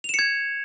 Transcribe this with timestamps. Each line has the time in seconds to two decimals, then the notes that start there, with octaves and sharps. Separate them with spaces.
0.04 F7
0.09 E7
0.14 C#7
0.19 G#6